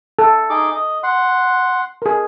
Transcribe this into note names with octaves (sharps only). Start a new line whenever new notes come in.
A4
D#4 G#4 D6
D#5
F#5 C6
G#4 A#4